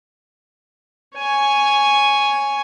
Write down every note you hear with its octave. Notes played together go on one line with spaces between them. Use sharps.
C#5 G#5